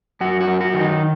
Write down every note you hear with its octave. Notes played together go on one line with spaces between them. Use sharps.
F#2 F#4
F#4
F#2
F#4
D#3
D#4